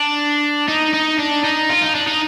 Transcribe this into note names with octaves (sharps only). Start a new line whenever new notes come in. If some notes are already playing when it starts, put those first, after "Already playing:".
Already playing: D4
D#4
D#4
D4
D#4
F4
D#4
D4
D#4